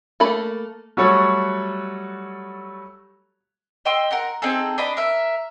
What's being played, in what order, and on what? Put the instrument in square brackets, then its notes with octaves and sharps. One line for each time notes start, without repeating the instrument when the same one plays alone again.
[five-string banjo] A3 A#3 A4 B5
[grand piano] F#3 G3 A3 F#4 A4 C#5
[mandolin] D#5 G5 C6 E6
A#4 F#5 A#5
C4 D#4 G#4 A4
D4 D#5 B5
A#4 E5